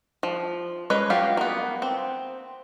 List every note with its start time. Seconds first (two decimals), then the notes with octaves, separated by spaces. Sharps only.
0.23 F3
0.90 G#3 C#4 B4
1.10 F#3 F4 G4 F5
1.37 A#3 B3
1.82 C4